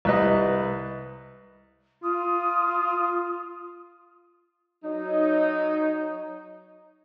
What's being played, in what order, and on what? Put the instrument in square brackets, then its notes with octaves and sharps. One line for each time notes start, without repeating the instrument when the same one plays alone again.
[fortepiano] C2 B4 D#5
[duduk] F4 [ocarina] D#6
[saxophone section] F#3 D#4